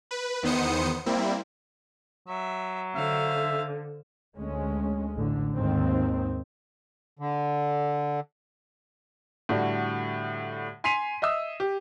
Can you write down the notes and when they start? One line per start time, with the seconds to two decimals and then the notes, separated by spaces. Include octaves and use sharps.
0.11 B4
0.43 E2 D#3 B3 C5 D#6 C#7
1.06 G3 A#3 C4 E4
2.28 F#3 E5
2.95 D3 C5 E5 F5
4.36 D2 G#3 C#4
5.16 A1 D3
5.55 D#2 G#2 D#3 C4
7.19 D3
9.49 A2 D3 G3 F#4
10.84 G#5 C6 B6 C7 D#7 F7
11.22 D#5 E5 D#6 E6
11.60 G4